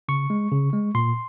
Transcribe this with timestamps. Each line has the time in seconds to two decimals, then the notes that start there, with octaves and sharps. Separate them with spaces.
0.08 C#3 C#6
0.30 G#3
0.52 C#3
0.73 G#3
0.95 A#2 C6